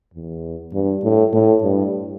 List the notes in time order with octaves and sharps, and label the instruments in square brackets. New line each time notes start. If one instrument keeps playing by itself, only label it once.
[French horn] E2
G2
A2
A2
G2